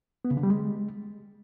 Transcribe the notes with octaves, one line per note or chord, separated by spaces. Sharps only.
B3
C#3
D3
G3
G#3